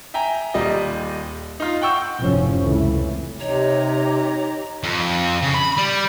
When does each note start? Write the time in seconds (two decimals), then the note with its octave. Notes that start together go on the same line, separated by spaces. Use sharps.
0.14 E5 G5 G#5 A#5
0.54 D#1 G3 D#5
1.60 D#4 F4
1.82 F#5 G5 C#6 E6 G6
2.21 F1 F#2 A2 F3 C#4
2.59 C#2 C3 E3 A3
3.40 C3 D#4 G4 C#5 A#5
4.84 F2
5.42 C#3
5.54 B5
5.77 G3